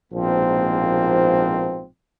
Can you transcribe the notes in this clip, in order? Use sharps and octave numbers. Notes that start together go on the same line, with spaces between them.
A#1 G#2 B2 F3 A#3 C4